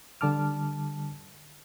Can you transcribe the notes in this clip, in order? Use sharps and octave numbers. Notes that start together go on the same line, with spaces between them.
D3 G3 A5 D6 F6